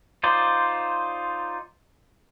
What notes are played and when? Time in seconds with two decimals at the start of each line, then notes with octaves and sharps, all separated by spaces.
0.23 D#4 F4 C5 D5